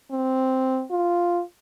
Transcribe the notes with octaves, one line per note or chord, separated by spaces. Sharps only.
C4
F4